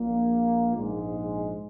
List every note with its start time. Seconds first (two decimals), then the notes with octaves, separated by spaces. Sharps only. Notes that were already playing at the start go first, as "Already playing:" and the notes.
Already playing: A#1 A#2 A#3
0.75 A#1 G#2 G#3